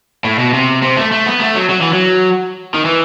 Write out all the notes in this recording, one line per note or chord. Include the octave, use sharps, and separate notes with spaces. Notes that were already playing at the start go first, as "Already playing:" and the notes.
A2
B2
C3
C3
A3
A3
B3
A3
F#3
F#3
E3
F#3
D#3
E3